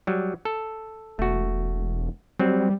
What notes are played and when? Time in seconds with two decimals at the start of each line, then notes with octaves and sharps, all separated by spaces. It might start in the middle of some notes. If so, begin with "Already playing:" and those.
0.07 F#3 G3
0.45 A4
1.19 E1 A3 F#4
2.39 F#3 G3 C4